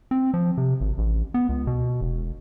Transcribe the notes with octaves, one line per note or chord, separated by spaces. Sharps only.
C4
F3
C3
G#1
A1
B3
C#2
B2
E1